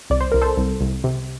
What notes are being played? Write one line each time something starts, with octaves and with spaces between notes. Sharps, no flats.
C2 D5
C5
C2 A#4
A4 C5
C2
C2
C3